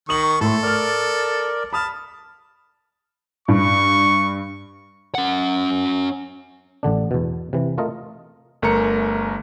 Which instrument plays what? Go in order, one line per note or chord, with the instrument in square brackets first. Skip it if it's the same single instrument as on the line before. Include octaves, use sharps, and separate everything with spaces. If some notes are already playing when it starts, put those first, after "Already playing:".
[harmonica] D#3 C#6 [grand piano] D#6 F#7
[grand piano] A2 A3 C6 [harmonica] A4
[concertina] A#4 D5 [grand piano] C#6 F6
[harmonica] A5 [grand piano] B5 D#6 F6
[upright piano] G2 [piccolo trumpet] C#6
[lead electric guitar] C#4 F#5
[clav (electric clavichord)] A1 D3 D4
E2 B2
C3 E3
A3 F4 A#4 D#5
[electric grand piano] G1 A3 A#4 A#5 C#7